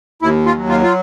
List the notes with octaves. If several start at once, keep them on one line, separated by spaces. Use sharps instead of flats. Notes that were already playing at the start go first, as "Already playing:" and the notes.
D#2 E4
F4
F#3
F4
F4